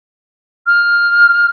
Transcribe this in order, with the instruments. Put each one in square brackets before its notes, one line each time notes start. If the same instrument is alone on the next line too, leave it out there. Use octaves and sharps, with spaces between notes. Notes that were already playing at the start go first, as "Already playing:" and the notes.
[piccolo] F6